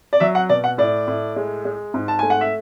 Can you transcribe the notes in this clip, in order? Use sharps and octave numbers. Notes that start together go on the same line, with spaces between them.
D5
F#3 E5
F#5
B2 D5
F#5
A2 D5
A2
G#3
G#3
G#2
A5
A3 G#5
F#5
E5